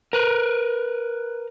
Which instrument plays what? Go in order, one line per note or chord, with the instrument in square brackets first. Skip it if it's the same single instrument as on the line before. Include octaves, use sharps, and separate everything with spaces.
[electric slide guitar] A#4 B4